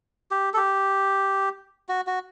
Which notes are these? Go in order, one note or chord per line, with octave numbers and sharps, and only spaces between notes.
G4
A4
G4
F#4
F#4